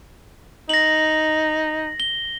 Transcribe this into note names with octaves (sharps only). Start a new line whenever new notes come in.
D#4 A#6 F#7
G7